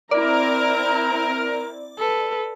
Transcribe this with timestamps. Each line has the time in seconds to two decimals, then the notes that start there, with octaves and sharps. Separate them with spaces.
0.11 C4 E4 A#4 D5 A#5
1.98 A4 B4